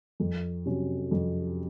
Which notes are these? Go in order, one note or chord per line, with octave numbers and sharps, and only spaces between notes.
F2
C3 F#3 C#4
F2